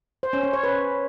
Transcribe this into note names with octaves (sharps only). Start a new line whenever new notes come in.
C5
C#4
C#4
C#5
B4